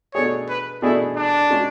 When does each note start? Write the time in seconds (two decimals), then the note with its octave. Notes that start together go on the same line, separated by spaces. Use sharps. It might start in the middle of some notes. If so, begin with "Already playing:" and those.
0.14 B2 A3 D4 G#4 C#5
0.49 B4
0.82 B2 A3 D4 E4 G#4
1.17 D4
1.50 G#3 C#4 F#4